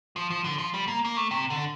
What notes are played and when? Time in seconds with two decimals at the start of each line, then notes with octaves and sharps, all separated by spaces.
0.16 F3
0.30 F3
0.44 D3
0.58 F3
0.74 G3
0.88 A#3
1.05 A#3
1.16 A3
1.31 C3
1.50 D3